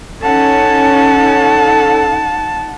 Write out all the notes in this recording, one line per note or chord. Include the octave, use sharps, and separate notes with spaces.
C#4 D#4 A4 F#5 A5